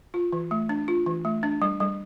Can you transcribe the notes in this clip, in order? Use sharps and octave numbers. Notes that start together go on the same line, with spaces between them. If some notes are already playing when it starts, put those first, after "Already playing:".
F4
E3
A3
D4
F4
E3
A3
D4
G3
G3